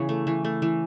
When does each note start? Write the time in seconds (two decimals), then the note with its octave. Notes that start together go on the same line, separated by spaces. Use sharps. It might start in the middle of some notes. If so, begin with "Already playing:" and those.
Already playing: C#3 E3 B3 C#5
0.09 A3
0.27 E3
0.45 A3
0.62 E3